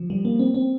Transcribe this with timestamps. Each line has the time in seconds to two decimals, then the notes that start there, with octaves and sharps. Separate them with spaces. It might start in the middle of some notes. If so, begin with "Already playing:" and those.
Already playing: F3
0.10 G3
0.25 A#3
0.39 C4
0.54 C4